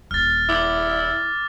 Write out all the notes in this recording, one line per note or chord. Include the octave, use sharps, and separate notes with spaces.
D#1 F6 A6
E4 D6